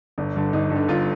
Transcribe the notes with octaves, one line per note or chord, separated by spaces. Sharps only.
G1 D4
G2 D3
G1 D#4
G2
D3
G1 F4